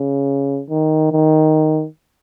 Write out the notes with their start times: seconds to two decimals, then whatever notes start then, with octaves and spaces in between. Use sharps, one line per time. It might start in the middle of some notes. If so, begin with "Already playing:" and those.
Already playing: C#3
0.70 D#3
1.11 D#3